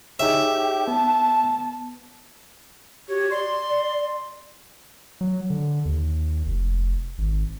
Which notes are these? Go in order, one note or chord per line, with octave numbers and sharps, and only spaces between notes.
D#4 G4 G#4 C#5 E5
B3 A5
F#4 G4 C#5
D5 C6
F#3
D3
D#2
F1
G#1